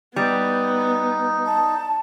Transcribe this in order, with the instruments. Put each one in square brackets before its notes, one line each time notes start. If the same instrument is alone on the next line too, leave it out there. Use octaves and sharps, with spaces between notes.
[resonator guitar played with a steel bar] G3 [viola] B3 [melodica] D#4
[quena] A5